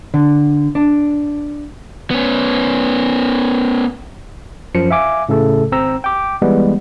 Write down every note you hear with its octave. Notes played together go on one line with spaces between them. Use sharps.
D3
D4
B3 C#4
F#2 F3 C#7
E5 F5 G#5 D6
A2 C#3 A3 A4
G#1 C4 A#5 E6
G5 D6
E3 G3 G#3 B3